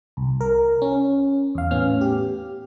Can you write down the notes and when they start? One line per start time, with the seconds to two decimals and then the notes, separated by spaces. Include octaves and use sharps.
0.17 C2
0.41 A#4
0.82 C#4
1.55 E2 F5
1.71 A2 B3 C#4 F6
2.01 G4